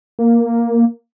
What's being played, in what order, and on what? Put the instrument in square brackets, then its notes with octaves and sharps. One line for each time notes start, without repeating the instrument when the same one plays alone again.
[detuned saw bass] A#3